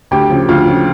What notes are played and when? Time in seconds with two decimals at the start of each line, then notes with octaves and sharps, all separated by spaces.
0.11 D2 G4
0.30 C#3 F3
0.49 D2 F4
0.67 C#3 F3